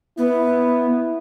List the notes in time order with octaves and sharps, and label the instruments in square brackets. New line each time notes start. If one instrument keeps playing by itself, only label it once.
[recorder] B3 [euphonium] E4